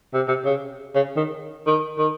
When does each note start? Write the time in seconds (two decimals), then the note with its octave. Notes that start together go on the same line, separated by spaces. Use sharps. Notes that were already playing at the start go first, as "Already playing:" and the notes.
0.14 C3
0.28 C3
0.45 C#3
0.95 C#3
1.16 D#3
1.67 D#3
1.98 D#3